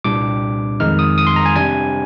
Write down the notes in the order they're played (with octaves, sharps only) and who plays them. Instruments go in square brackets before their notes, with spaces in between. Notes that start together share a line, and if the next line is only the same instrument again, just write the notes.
[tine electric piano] C2 A#2 G3 D4 D6
F2 D#3 G#3 D#4 F6
D#6
D#6
C6
A#5
G#5
C3 G3 D4 G#5